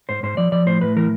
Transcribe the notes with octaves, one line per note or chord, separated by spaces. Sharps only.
G#2 C5
G#2 C5
F3 D5
F3 D5
A2 C5
A2 B4
E3 A#4